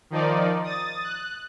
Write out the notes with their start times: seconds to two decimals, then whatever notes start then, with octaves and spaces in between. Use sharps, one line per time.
0.10 D#3 F3 D#4 D5
0.63 D#6 A6
1.03 F#6